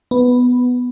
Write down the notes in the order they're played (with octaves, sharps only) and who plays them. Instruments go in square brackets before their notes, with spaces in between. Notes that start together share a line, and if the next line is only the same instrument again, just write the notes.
[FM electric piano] B3